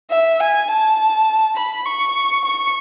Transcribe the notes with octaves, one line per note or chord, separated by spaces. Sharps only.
E5
G#5
A5
B5
C#6
C#6